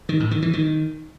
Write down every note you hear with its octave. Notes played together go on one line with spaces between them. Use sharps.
D#3
A2
D#3
E3
D#3